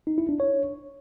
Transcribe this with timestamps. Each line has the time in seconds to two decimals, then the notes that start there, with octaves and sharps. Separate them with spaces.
0.07 D#4
0.18 E4
0.29 D4
0.40 C#5